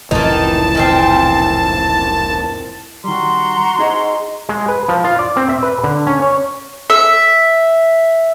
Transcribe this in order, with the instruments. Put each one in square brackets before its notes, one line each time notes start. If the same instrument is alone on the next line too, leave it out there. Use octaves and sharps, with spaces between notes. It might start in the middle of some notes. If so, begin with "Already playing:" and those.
[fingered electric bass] F1 C#2 A2 [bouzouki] D#3 D#4 [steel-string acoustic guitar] E3 [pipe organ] A5
[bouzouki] A#2 D#3 C4
[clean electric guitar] D#3 G3 [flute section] F#4 A#5 C6
[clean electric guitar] D#4 G#4 D#5
[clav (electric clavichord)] G#3
B4
F3
F4
D5
C4
E5
B4
D3
C#4
C#5
[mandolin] E5